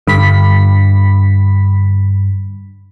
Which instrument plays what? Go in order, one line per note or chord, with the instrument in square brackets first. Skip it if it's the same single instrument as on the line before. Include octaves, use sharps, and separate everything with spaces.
[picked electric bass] G2 [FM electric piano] D3 B5 B6